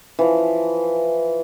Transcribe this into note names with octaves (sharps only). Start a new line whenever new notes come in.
E3 F3